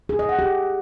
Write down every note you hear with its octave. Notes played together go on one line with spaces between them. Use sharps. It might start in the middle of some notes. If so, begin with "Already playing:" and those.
G#4
D#5
F#5
G4